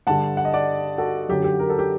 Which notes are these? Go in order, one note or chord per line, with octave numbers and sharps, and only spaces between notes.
G2 D3 G3 F#5 A5
F#5
D#5
D5 F#5
F#4 A4
F#2 D3 F#3 G4
G4
A#4
A4
G4